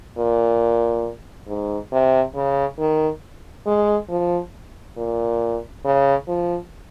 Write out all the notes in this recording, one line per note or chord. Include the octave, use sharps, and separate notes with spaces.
A#2
G#2
C3
C#3
D#3
G#3
F3
A#2
C#3
F3